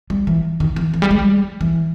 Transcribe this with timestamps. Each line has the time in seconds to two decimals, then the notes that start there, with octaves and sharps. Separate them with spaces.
0.10 G3
0.27 E3
0.60 D#3
0.76 E3
0.94 E3
1.02 G3
1.11 G#3
1.19 G3
1.61 E3